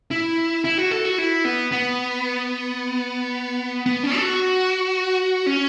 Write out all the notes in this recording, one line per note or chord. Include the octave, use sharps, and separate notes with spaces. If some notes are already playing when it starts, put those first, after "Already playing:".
E4
E4
F#4
A4
F#4
E4
B3
B3
B3
C#4
A4
F#4
C#4